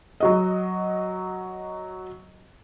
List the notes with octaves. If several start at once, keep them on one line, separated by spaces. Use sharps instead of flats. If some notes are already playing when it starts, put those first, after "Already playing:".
F#3 F#4 D#5